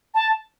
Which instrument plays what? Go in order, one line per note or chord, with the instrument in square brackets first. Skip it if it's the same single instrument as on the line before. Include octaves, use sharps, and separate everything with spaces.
[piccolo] A5